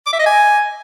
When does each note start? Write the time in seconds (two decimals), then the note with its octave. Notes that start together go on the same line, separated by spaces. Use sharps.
0.07 D6
0.13 E5
0.20 D#5
0.26 G#5